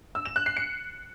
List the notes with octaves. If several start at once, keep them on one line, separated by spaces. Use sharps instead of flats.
E6
E7
F#6
C7
C#7